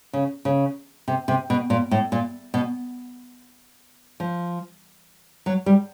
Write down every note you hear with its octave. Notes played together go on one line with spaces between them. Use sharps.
C#3
C#3
C3
C3
B2
A#2
A2
A#2
B2
F3
F#3
G3